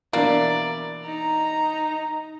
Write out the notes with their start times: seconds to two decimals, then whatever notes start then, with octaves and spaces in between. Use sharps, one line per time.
0.13 B2 E3 A#3 D4 D5
1.07 D#4 A#5